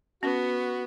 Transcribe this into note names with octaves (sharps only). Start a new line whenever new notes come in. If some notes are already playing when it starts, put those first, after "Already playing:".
B3 C#4 F#4